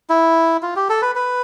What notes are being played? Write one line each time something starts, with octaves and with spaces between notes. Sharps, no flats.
E4
F4
G4
A4
B4
B4